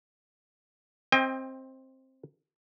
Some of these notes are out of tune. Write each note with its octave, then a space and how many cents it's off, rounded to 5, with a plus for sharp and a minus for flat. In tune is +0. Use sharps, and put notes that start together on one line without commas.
C4 +10 D#5 +20 G5 +30